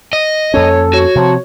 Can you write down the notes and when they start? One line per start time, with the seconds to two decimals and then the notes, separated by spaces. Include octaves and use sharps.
0.13 D#5
0.54 F2 A#3 C#4 A4 C#5
0.93 F#4 C#5
1.15 C3 F3 C4